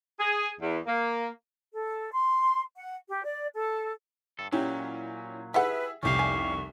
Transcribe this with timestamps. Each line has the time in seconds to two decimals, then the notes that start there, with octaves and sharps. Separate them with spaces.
0.19 G#4
0.60 E2
0.86 A#3
1.73 A4
2.13 C6
2.75 F#5
3.08 G4
3.23 D5
3.54 A4
4.39 G2 A4
4.52 A#2 F#3 C#4 E4 G4
5.54 E4 G4 G#4 B4 E5 F#5
6.03 F1 C2 C#4 G4 F5 C#6
6.19 G#5